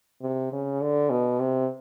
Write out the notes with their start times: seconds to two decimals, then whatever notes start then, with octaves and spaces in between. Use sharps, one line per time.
0.22 C3
0.52 C#3
0.81 D3
1.10 B2
1.40 C3